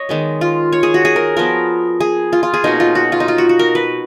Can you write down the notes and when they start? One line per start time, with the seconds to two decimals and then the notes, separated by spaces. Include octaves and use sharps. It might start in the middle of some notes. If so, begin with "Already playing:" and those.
Already playing: C#5 D#5
0.09 D#3 G#3 B3
0.41 F4
0.72 C#5
0.83 G#4
0.94 F#4
1.05 G#4
1.16 A#4
1.37 F3 B3 A#4
2.00 G#4
2.33 F4
2.43 F4
2.54 G#4
2.64 B2 A#3 C#4 D#4
2.80 F4
2.95 F#4
3.12 F4
3.20 D#4
3.28 F4
3.38 F#4
3.49 F#4
3.59 A#4
3.75 B4